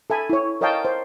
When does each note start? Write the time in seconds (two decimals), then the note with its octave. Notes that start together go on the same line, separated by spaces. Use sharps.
0.10 A4 E5 G#5 B5
0.30 E4 C#5
0.61 A#4 C#5 D#5 F5 G5 A5
0.85 C5